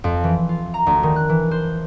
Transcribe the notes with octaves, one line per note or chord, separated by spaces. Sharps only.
F2
E3
F4
A#5
D2
D#3
F#6
E3
C5